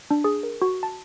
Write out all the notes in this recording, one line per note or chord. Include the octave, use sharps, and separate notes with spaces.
D4
G#4
A#4
F#4
A5